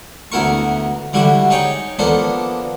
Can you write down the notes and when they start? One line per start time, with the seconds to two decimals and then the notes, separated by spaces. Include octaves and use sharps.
0.32 D2 B3 E4 A#4 C#6
1.13 D3 G3 E4 F#4
1.50 D#4 G#4 C#5 G5
1.99 F3 A#3 B3 D4 A4